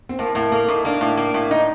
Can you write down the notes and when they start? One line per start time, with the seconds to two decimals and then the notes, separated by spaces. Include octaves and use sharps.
0.09 C4
0.19 A2 A#3
0.35 A2 A#3
0.51 A3 A#3
0.68 A2 D#4
0.85 A#3 D4
1.01 A2
1.17 A#3
1.34 A2
1.51 D#4